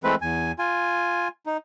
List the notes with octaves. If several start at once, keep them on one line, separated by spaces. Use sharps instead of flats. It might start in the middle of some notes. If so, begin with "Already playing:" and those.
E3 G#3 A3 C4 B4
E2 G#5
F4 G#5
D#4